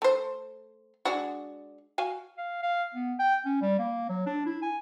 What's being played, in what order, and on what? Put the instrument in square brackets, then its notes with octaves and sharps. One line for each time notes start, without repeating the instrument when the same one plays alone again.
[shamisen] A3 C5
G#3 D4 F#4
F#4 F5 G#5
[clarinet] F5
F5
B3
G5
C#4
G3
A#3
F#3
D4
E4
G#5